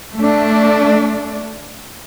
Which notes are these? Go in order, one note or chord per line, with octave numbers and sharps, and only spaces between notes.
A3 D4